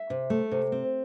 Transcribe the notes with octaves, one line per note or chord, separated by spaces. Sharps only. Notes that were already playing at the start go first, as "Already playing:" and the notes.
Already playing: E5
C3
A3
C3
C4